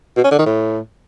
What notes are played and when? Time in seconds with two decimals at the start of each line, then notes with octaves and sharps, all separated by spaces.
0.16 B2
0.24 C#4
0.31 D3
0.39 D#3
0.46 A2